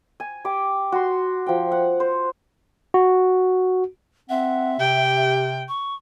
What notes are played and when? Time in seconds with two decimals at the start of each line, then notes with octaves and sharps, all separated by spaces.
0.20 G#5
0.45 G4 G5 D6
0.92 F#4 C6
1.46 F3 G5
1.72 F#5
2.00 C5
2.94 F#4
4.30 C4 E5 F#5
4.80 C3 G4 G5
5.68 C#6